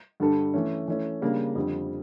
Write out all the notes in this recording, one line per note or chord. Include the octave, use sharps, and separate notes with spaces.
G2 D3 G3 D4 A4
E3 A3 C#4
E3 A3 C#4
C#3 G3 A#3 D4
F2 D3 G3